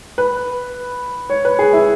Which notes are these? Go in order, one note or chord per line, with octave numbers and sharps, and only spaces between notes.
B4
C#5
B4
G#4
E4